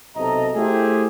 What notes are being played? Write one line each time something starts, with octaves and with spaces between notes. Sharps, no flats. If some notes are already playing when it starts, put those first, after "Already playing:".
B1 C3 A4 D#5 A#5
A3 E4 G4 G#4 C5 E5